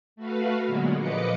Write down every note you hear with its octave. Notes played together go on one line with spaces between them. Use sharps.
A3 F#4 B4 F5
A#2 D3 F#3 G#3 A#3 B3
A#2 F3 B4 D#5 D6 C#7